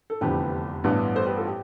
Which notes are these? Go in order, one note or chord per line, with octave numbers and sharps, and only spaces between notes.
A4
F1 E2 D3 F3 G4 B4
A1 G2 E3 B3 D4
A4 C5
G4 B4
F4 A4
G4